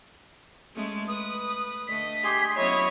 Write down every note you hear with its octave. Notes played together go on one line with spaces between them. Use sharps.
G#3 A3 C#4
B4 D#6
D3 A3 D#5 B6
G4 G#4 C6
F#3 B3 C#4 E4 C#5 D#5